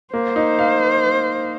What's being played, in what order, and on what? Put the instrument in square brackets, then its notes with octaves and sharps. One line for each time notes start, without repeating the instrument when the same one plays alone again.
[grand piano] A#3 [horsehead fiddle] C5
[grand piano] D#4
F5